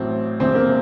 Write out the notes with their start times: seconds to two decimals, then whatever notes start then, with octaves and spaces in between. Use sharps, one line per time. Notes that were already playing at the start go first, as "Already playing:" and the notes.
Already playing: A1 A2 F#3 C4
0.40 E1 E2 C3 C4
0.55 A#3